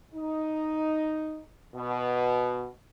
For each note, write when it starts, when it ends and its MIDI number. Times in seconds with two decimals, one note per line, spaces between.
0.13 1.41 63
1.74 2.67 47